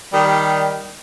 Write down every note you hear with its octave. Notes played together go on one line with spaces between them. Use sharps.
D#3 G3